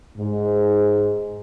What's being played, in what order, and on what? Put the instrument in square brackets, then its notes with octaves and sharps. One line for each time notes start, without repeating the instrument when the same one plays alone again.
[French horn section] G#2